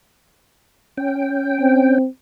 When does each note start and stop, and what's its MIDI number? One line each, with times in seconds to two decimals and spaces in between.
0.97 1.98 61
0.97 1.98 79
1.61 2.06 60